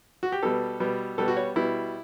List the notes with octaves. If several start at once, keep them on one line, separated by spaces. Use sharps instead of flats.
F#4
G4
B2 G3 B3 A4
B2 G3 B3
B2 G3 B3 A4
F#4
C#5
B2 G3 B3 E4